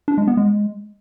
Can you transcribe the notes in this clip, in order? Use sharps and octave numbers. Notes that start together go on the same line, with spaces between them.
D4
G#3
B3
G#3